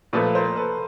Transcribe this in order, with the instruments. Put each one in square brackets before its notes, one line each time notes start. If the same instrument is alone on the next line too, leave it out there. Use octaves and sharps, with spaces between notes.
[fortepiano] A#2 F3 A3 [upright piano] A4 B4
[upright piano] A#4 C5
A4 B4